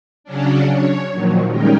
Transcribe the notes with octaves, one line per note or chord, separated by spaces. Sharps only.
C#3 F#3 C#4 D4
C#5
A#2 D#3 F3 F#3
G3 G#3 C#4 D#4 A#4 G5